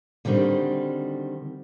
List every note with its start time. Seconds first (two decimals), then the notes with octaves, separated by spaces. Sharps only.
0.25 D3 D#3 G3 C4 F#4